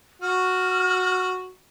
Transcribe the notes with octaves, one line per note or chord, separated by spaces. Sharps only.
F#4 F6